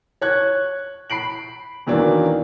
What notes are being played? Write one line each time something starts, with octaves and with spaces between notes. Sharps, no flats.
C#5 F#6 G#6
B5 C7 D7 F#7
E2 D#3 E3 F#3 A#3 D4